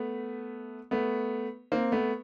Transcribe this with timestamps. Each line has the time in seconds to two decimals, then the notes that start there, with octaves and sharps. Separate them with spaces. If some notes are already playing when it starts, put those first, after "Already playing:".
Already playing: A3 B3
0.91 A3 B3
1.72 A#3 C4
1.92 A3 B3